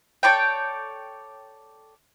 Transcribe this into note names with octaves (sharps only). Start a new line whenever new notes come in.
A4 C#5 D5 G5